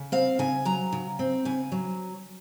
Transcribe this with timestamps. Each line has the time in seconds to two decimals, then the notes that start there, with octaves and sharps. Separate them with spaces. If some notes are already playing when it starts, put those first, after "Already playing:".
Already playing: C#3
0.12 C4 F5
0.39 C#3 G#5
0.65 F#3 A#5
0.93 C#3
1.19 C4
1.45 C#3 G#5
1.72 F#3